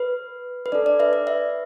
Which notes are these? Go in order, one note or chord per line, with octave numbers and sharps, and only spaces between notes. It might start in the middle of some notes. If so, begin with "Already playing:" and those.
Already playing: B4
B4
D4 A4 D5
D5
B4 E5
D5
B4 E5